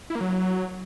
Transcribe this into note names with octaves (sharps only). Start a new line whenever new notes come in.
E4
A#3
F#3